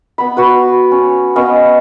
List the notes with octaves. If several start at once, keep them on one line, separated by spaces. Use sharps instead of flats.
B3 B5
F#4 B4
C#4
B3 C#4 D#5 F5